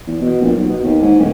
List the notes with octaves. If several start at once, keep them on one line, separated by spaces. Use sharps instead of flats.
E2
B2
A#1
B1
B2
D#2
G#2
D1